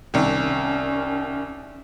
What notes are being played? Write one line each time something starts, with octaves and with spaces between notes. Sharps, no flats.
C2 D#3 C#4